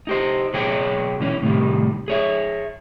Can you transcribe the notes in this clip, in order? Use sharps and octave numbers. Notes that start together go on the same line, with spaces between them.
D#4 G4 C5
B2 F#3 G#4 C#5 G5
B2 E3 C#4
A2 C3 D#3 G3
G#4 C#5 E5